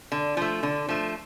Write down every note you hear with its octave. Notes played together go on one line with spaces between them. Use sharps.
D3
F3 A3
D3
F3 A3